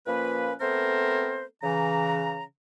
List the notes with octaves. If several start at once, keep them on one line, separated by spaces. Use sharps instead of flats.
A#2 F3 A#3 C#4 B4
A3 B3 C4 A4 A#4 C5
C#3 E3 A#5